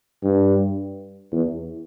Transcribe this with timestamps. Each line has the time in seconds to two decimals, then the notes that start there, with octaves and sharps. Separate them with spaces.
0.23 G2
1.32 E2